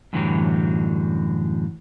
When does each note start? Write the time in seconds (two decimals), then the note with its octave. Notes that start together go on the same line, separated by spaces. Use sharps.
0.13 F#2 A2 D3 E3 F#3 G3